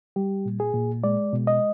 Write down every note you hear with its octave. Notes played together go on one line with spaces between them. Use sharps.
G3 G4
A#2
G#4
A#2
G#3 D5
B2
D#5